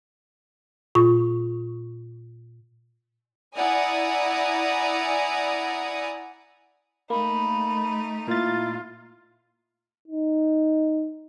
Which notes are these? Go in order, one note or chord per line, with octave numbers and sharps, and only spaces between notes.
A#2 F4 C#6
E4 D5 F#5 G#5 A#5 D#6
A3 A#3 D#4 B5
A#2 E4 F4 A6
D#4